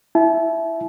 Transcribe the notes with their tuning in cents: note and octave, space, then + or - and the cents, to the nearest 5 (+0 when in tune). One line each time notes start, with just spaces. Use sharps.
E4 +0 A5 -40